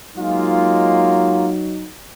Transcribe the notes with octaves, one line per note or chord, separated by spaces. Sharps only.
F#3 G#3 A#3 D#4 F4